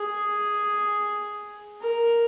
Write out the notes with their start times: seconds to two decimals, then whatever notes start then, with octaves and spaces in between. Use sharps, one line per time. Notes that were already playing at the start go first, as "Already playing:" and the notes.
Already playing: G#4
1.81 A#4